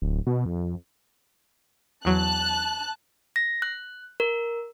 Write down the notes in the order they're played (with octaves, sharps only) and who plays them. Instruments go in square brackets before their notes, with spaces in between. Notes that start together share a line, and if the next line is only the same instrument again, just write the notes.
[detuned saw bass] D1
B2
F2
[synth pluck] E2 F#3 [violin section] A5 F#6
[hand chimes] A#6
F#6
A#4